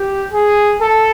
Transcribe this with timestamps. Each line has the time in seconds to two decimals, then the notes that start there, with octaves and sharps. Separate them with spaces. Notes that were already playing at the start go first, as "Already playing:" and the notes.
Already playing: G4
0.32 G#4
0.81 A4